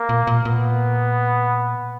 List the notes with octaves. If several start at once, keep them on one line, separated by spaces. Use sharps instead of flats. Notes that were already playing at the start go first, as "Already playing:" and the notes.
Already playing: A#3
A#2
A#2
A#2 B3